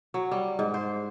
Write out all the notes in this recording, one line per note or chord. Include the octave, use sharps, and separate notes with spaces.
F#3
G3
G#2
C5